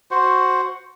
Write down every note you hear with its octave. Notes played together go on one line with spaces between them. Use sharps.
F#4 C5